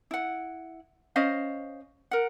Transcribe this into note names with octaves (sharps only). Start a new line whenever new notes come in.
E4 F#5
C#4 C5 D#5 F5
A#4 F#5